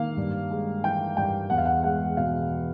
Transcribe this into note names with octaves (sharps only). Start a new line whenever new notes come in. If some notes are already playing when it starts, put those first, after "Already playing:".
Already playing: D#3 A#3 F5
G2
G#3
E3 G5
G2 G5
E2 F#5
F5
F#5
G#3 F#5
B2 F5